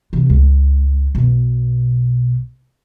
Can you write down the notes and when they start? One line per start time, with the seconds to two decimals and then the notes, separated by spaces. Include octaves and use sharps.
0.13 C3 E3
0.30 C#2
1.15 B1 B2